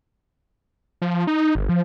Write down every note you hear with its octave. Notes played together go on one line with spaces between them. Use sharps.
F3
D#4
G1
F3